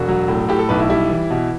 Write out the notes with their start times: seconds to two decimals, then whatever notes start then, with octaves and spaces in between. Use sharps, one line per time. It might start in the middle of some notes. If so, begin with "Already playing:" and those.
Already playing: E1 F#4
0.09 F#3
0.28 A2
0.48 A2 G4
0.59 A4
0.69 B1 B4
0.79 E4
0.89 G3 E4
1.10 E3
1.31 B2